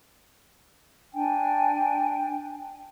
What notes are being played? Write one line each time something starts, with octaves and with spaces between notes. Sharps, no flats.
D4 G5 G#5